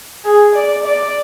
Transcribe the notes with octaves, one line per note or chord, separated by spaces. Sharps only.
G#4
D5
D5